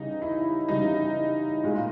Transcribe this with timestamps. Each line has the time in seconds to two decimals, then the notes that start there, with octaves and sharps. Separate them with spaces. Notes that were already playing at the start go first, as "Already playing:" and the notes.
Already playing: C#3 E3 G3 D#4
0.22 E4
0.68 C#3 E3 G3 D#4
1.64 A#2 G#3